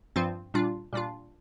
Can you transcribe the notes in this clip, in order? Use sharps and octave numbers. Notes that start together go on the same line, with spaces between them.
G2 F3 C4 F4
A#2 G3 D4 F4
A#2 G3 D4 F4